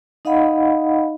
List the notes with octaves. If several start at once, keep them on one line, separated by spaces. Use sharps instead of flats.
D#4 D#5 F5 F#5 B5